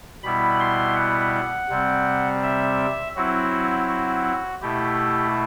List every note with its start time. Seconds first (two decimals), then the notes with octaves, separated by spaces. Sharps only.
0.23 B2 G3 B3 E4 B5
0.60 C6
0.96 F#5
1.69 C3 G3 C4
2.43 E5
3.16 F#3 C4 E4 F#4
3.89 F#4
4.62 B2 A3 E4 G4